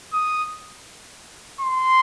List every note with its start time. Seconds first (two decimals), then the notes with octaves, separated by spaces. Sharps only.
0.13 D#6
1.61 C6